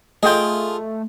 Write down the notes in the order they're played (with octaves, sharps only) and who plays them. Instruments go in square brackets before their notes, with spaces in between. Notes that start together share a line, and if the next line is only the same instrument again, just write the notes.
[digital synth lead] A3 [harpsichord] F4 G#4 [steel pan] D#5 G5